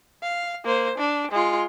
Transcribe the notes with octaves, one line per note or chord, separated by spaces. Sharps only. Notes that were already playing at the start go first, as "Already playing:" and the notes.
F5
A#3 C5
D4
G#3 F4